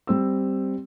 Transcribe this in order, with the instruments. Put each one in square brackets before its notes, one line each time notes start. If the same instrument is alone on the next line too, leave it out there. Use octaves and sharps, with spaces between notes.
[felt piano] G3 C4 E6